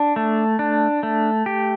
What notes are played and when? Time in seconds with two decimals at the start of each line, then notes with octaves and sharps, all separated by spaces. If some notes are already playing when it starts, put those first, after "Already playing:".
Already playing: D4
0.16 A3
0.59 D4
1.03 A3
1.46 G4